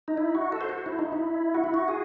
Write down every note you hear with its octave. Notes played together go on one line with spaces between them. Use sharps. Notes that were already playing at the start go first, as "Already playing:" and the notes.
D#4
E4
F#4
A4
C5
F#4
E4
D#4
E4
F#4
E4
F#4
G#4